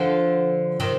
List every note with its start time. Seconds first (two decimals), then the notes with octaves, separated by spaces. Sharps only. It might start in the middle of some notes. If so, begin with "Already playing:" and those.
Already playing: D3 F3
0.80 C3 D#3